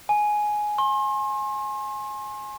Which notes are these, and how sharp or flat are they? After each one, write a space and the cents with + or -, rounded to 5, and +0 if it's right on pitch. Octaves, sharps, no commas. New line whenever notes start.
G#5 +10
C6 +40